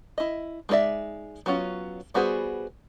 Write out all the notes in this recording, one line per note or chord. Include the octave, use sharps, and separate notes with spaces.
E4 D#5
G#3 D#4 A4 D5 E5
F#3 B3 C#4 F4
G3 B3 F#4 G#4 C5